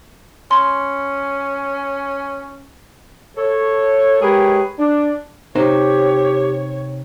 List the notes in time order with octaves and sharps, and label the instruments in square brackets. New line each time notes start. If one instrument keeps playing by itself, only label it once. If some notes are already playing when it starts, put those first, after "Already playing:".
[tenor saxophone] C#4 [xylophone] C6
[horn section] A4 C#5
G#3 G4 G#4 A#4 B4 C#5
D4
[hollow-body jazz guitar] C3 D#4 C5 [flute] G4 [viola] C#5